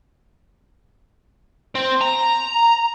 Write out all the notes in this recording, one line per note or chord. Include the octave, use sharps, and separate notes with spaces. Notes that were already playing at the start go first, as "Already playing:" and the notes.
C4
A#5